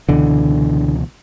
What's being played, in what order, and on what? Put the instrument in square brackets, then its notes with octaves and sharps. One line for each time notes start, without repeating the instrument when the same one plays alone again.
[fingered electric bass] C#2 B2 E3 [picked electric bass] D3